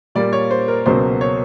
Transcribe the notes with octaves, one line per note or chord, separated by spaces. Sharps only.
A#2 G3 A#3 D5
C#5
C5
A#4
C#2 B2 F#3 A#3 C5
C#5